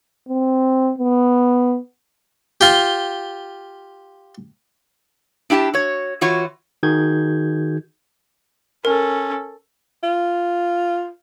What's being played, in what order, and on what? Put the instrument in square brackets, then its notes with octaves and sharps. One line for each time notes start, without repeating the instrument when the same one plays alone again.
[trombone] C4
B3
[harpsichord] F4 G4
[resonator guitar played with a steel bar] D4 E4 G4 G5 A5
F#4 C#5
E3 F4 F#4 C#5
[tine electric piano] D#3 D#4 F#4 G#4 G6 G#6
[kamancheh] C#4 A4 [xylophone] A#4
[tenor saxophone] F4